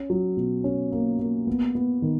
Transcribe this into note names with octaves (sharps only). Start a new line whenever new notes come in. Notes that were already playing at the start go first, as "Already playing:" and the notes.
Already playing: C#4
F#3
B2
C#4
A#3
A#3
B3
B3
D#3